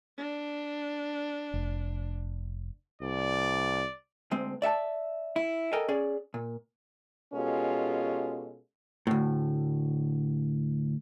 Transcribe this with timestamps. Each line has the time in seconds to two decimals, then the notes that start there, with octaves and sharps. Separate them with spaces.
0.18 D4
1.54 F1
3.02 C2 D5
4.31 D2 G#3 C4
4.62 D5 E5 F#5 A5
5.36 E4
5.73 A4 A#4 D#5 G5 G#5
5.88 C#4 G#4 D5
6.34 A#2
7.33 B2 G#3 C#4 F4 G4 A4
9.07 D2 A2